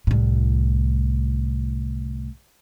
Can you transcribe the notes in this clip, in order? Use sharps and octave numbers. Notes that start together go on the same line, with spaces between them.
C2 A2